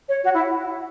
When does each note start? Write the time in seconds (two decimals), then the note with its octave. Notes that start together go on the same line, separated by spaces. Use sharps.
0.08 C#5
0.23 F#4
0.33 E4